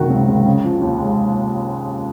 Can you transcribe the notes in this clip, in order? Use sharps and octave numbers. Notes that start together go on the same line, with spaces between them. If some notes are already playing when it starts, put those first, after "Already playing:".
Already playing: F#1 C3 D#3 F#4
C#2
C#2
C#3
F3
D#2
G#3